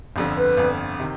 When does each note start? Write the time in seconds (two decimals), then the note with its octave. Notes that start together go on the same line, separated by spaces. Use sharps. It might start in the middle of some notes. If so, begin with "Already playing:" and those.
0.16 G1 F2 D3 G4
0.37 B4
0.58 G1 F2 D3
1.00 C3 D#3